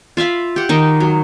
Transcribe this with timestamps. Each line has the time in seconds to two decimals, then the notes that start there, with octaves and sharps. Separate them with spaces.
0.17 F4 E5 F5 B5
0.56 G4 F#5
0.69 D#3 D#4 D#5
1.00 F#3